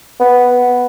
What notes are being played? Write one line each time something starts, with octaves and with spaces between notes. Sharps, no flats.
B3